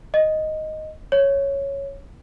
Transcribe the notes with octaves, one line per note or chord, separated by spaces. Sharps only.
D#5
C#5